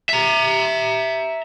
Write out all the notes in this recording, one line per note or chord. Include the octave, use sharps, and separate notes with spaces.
E5 A#5